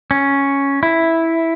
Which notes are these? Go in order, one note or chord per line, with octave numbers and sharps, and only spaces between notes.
C#4
E4